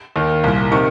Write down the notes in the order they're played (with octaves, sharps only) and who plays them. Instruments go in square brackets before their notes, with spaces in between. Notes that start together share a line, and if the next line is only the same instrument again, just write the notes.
[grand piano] D#2 D#3
C2 A#2
C3 D#3 C#6